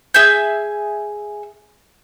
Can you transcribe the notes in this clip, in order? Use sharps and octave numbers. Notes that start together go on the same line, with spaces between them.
G#4 E5 G#5 G6